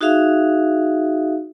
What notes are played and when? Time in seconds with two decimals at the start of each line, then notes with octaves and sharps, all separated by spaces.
0.01 D#4 F#4 G#4 E5 F5